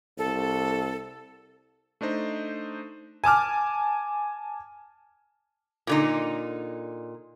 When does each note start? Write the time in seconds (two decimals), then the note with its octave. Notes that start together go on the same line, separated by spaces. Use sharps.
0.18 C2 A4
2.01 A3 D4 D#4 C5 D#5
3.24 G#5 A5 D6 F6
5.87 A#2 D3 D#4